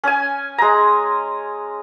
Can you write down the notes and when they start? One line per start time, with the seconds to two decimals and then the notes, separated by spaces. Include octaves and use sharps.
0.04 C#4 G#5
0.58 G#3 A#5